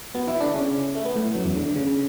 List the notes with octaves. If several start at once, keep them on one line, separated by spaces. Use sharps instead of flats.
B2 B3
E3 E4
D3 D4
C#3 C#4
A3
B3
A2 A3
F#2 F#3
E2 E3
D3
D3
C#3